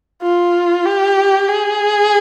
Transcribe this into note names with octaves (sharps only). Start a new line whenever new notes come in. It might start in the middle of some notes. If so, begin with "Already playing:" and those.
F4
G4
G#4